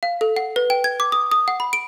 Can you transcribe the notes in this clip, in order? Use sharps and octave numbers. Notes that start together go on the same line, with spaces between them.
F5
A4
F#5
B4
G5
G#6
D6
D#6
D#6
F#5
B5
D7